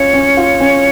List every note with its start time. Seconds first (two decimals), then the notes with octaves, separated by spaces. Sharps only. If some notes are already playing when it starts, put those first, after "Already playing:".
Already playing: C#4 F4 C#5
0.13 C#4
0.37 F4
0.60 C#4